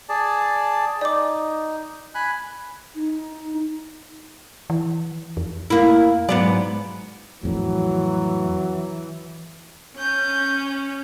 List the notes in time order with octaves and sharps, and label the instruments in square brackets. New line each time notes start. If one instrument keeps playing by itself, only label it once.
[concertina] G#4 D5 A5
[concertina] D#4 [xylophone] D5 D6
[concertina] G#5 B5 F#6
[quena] D#4
[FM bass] E3
F2
[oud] A#3 E4
[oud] G#2 B3 D5 [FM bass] F#3
[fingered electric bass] F2 A2 [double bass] E3 [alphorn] F#3
[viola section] C#4 [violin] G6